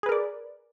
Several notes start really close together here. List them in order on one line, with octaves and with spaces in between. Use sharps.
G#4 B4 A#4 D5